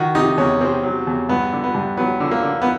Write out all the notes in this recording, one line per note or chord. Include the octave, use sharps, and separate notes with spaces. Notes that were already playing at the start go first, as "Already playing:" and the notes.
Already playing: D#3 F#4
C3 D#4
E2 C#4
C3 C4
F#3
E2
G2 B3
D3
B3
G2
F#3 B3
D3
A#3
D3
B3